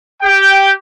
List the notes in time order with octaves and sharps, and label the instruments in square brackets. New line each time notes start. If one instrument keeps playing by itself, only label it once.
[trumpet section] G4 G5